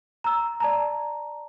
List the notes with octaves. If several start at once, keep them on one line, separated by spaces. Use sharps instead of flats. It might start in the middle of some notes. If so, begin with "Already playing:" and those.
A#5 E6
D5 A5 A#5